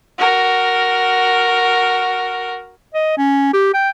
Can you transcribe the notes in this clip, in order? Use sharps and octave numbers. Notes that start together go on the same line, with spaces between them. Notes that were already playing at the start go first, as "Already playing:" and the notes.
F#4 A#4
D#5
C#4
G4
G5